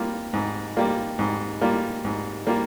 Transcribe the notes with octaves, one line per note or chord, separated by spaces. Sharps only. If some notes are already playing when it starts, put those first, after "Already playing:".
Already playing: G3 A#3 F4
G#2
G3 A#3 F4
G#2
G3 A#3 F4
G#2
G3 A#3 F4